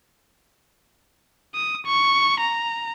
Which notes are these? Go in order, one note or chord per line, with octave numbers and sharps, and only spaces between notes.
D#6
C#6
A#5